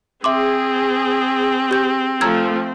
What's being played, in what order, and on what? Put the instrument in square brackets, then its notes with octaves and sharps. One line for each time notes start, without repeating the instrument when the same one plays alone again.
[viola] C4 [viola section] G#4 [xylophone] E5 C6 D6
[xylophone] G4 G6
[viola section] F3 A3 [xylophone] A#5 E6 G#6